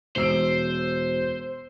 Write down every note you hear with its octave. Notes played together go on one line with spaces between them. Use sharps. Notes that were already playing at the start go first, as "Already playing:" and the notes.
E1 C5 E6 D7